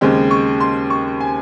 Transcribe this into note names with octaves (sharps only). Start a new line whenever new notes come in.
D#2 C#3 G#3 C4
C#6
C6
C#6
G#5